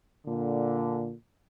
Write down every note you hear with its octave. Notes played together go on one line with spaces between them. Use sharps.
A#2 D3